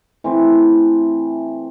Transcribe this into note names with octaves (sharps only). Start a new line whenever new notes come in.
E3 A3 C4